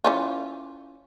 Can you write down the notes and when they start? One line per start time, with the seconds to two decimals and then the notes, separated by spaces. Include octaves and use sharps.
0.04 E3 C#4 F4